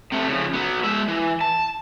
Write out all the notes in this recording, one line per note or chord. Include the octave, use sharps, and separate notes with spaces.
C3 A3
C#3 F3
F#3 B3
G#3 E5
E3
A5